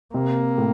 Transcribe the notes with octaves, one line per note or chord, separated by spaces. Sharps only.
C3 A#3
A2